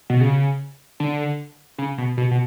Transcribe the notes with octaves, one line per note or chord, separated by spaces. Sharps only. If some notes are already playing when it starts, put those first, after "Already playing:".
B2
C#3
D3
C#3
B2
B2
B2